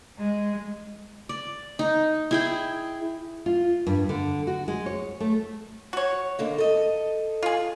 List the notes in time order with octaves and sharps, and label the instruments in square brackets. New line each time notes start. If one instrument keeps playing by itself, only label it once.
[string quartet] G#3
[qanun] D5
D#4
E4 G#4 G5
[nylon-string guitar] F4
G2
D3
F#4
G#3
C#5
A3
[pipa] F#4 C#5
[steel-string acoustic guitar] D3 D#3 A#3
A4 D#5
[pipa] F4 G#4